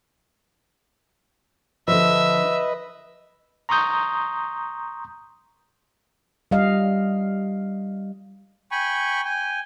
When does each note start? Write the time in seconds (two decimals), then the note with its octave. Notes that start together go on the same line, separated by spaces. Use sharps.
1.88 D3 F3 B4 D#5 E5
3.69 A#5 C6 C#6 D#6 G6
6.51 G3 D#5 F5
8.71 G5 G#5 B5 C#6
9.25 G5 G#5